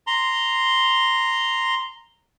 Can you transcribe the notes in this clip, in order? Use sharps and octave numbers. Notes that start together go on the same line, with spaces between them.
A#5 C6